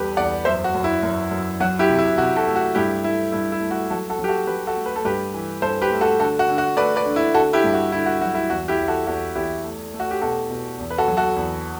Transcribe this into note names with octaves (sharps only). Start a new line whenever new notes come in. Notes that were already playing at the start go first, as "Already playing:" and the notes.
Already playing: E2 G3 G4 A4 B4
E2 D5 F#5
F#2 C5 E5
F#4
F#2
E4
F#2
F#2
F#3 F#4
E4 G4
C3
E4
C3 F#4
F#4 A4
A3
F#4
G2 E4 G4
A3 E4
G2 E4
E4
A3
F#4
F#3 F#4 A4
F#4 A4
F#3
G4
F#4 A4
F#3 G4 B4
F#4 A4
A3
B4
A4
G2 G4 B4
E3
G2 A4 C5
G4 B4
A3
F#4 A4
D3 F#4 A4
F#4
D3
F#4
A3 B4 D5
B4 D5
D3
E4
D3 F#4 A4
E4 G4
G2
F#4
D3 E4
F#4
F#3 F#4
E4
E2 F#4
E4 G4
E2
F#4 A4
E2 F#4 A4
E2 E4 G4
A3
A3
F#4
G4
B2 F#4 A4
B2
E2
B4
F#4 A4
F#3
F#4 A4
E2